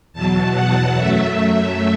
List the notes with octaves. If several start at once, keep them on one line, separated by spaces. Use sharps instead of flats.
E2 B2 F#3 A5
F#5
F#2 F#3 A3 E5